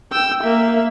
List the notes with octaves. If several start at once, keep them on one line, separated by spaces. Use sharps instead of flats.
G5 E6
A#3 E5